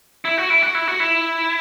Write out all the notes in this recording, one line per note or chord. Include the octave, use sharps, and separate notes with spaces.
E4
F#4
E4
F#4
E4
F#4
E4